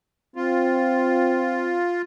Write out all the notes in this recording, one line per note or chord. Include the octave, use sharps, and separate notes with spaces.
C4 F4